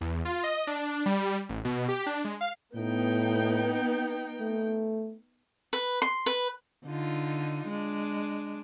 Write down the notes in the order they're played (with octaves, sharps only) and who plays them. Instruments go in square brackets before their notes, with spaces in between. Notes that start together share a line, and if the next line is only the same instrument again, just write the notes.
[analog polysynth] E2
F4
D#5
D4
G3
A1
B2
G4
D4
G#3
F5
[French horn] A2 [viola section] B3 D#4 G5
[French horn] A3
[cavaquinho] B4
C6
B4
[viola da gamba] D3 D#4 F4
G#3 D4